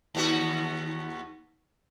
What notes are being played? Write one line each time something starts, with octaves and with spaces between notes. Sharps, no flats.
D#2 B3 F#4